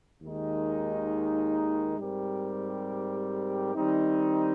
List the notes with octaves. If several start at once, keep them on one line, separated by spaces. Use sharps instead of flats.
D#2 D#3 G#3 D#4
G#2 G3 C4 G4 A#4
D#3 G3 C4 D#4